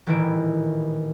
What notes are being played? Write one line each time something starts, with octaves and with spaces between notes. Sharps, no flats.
D#1 A1 D#3 E3 E4 D7